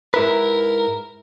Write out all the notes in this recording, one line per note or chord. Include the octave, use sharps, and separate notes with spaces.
G#2 E4 A#4 B4